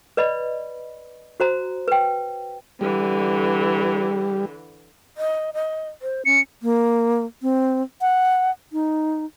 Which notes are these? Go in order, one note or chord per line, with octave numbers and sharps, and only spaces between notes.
B4 D5 D#5 B5
F#4 C5 A#5
B4 G5
D3 E3 G3
D#5
D#5
C5
C#4 C#7
A#3
C4
F#5
D#4